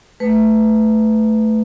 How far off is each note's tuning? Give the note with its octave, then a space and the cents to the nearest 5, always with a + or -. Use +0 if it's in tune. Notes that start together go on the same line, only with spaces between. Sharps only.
A3 +0 B4 +15